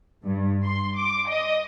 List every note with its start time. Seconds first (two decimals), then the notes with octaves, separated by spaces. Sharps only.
0.24 G2
0.63 C6
0.96 D6
1.29 D#5